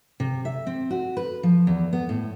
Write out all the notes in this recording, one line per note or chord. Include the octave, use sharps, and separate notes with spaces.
C3
E5
C4
F#4
B4
F3
E2
B3
A2